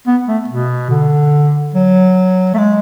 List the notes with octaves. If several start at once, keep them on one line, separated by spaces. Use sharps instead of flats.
B3
A3
B2
D3
F#3
A3
G#3